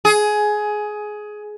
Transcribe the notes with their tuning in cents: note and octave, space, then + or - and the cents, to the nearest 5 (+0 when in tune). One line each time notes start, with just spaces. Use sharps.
G#4 +15